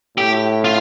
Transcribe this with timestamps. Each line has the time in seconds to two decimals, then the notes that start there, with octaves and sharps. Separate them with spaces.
0.18 A2 G4
0.64 F4